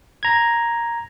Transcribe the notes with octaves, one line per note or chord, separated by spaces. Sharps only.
A#5 G#6